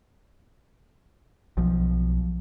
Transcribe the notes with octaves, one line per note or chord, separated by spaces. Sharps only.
B1 F3